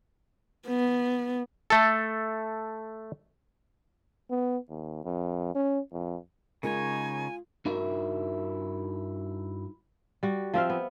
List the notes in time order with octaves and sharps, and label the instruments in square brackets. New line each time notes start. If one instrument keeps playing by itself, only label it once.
[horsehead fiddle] B3
[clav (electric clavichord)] A3 A4
[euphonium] B3
D#2
F2
C#4
F2
[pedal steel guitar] C#3 D#4 C#5 [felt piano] G#3 A#4 [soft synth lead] F4 [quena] G#5
[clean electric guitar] G2 D#4 E4 F#4 A#4 E5
[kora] G3 F#4
F3 C4 E5 F5
B3